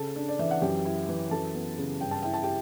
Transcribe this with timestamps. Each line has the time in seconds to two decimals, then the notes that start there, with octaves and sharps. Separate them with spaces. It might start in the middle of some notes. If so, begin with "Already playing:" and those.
Already playing: C#3 A4 A5
0.16 D4
0.29 D5
0.39 E3 E5
0.51 F#5
0.62 F#2 G4 G5
0.85 E4
1.09 E3
1.31 F#2 A4 A5
1.55 B3
1.78 C#3
2.01 G2 G5
2.11 A5
2.23 E4 G5
2.34 A5
2.43 G4 G5